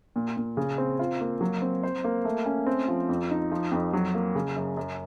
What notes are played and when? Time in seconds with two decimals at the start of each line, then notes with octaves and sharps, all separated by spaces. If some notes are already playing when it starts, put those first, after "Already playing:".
0.16 A#2
0.37 A#2
0.57 C#3
0.78 C4
0.99 F4
1.21 A#3
1.41 F#3
1.62 C4
1.83 C5
2.04 A#3
2.25 A3
2.46 C#4
2.67 C4
2.88 F3
3.09 F2
3.30 D#4
3.52 F3
3.71 F2
3.93 F#3
4.14 A#3
4.35 C#3
4.56 F#2
4.77 F#2